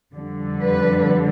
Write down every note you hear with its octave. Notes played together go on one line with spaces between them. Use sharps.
F2 D3 G3
B4